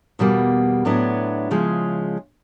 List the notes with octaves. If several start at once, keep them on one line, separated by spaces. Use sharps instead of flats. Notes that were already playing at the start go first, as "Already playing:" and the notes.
E2 B2 G3 A#3
A2 F#3 B3 D4
C#3 F3 G#3